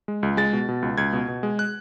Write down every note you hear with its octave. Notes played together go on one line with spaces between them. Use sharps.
G#3
C#2
G#3 A6
B2
B2
C#2
C#2 G#6
B2
B2
G#3
F#6